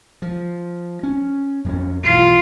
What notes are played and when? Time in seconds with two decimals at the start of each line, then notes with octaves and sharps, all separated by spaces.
0.22 F3
1.03 C#4
1.64 F2 A#3 C#4
2.03 B1 E3 F4